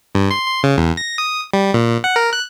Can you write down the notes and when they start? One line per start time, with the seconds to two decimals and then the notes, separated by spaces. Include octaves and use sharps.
0.15 G2
0.31 C6
0.48 C6
0.63 C#3
0.77 E2
0.97 A#6
1.18 D#6
1.54 G3
1.74 A#2
2.04 F#5
2.16 A#4
2.33 F#6